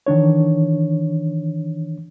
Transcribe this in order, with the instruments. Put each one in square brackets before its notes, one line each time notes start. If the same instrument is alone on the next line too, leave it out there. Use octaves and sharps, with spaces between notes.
[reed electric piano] D#3 E3 D4 C#5